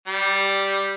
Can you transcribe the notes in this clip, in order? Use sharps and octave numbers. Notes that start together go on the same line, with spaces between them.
G3